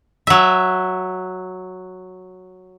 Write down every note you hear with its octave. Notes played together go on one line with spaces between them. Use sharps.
F#3 E5